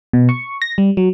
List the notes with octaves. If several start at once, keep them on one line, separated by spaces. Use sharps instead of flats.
B2
C#6
A#6
G3
F#3